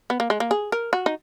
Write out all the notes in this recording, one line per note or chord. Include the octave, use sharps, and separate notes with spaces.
B3
A#3
G#3
A#3
G#4
A#4
F#4
D#4